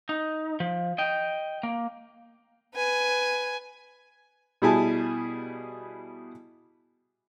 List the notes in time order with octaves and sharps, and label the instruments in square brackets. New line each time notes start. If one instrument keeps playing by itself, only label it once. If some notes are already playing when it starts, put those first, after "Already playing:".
[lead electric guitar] D#4
F3
D#5 G5
A#3
[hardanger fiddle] B4 G#5
[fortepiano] B2 G3 E4 G#4 G#5 A5